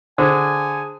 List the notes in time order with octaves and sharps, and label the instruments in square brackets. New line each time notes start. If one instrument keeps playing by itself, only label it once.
[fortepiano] D3 [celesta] G#4 D#6 G#6 [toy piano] C5 [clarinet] G#5